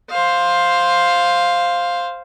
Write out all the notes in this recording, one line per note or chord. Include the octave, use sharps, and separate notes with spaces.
C5 F5